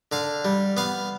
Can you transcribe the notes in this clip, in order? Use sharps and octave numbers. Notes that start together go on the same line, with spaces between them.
D3 F5
G3
B3 F5